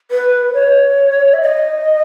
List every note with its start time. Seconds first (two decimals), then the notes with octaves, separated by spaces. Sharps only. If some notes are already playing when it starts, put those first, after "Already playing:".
0.11 B4
0.54 C#5
1.33 E5
1.41 D#5